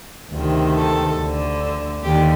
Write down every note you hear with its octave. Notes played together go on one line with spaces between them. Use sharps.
D2 C3 D#3
A4
D2 D3
D#2 D3 G4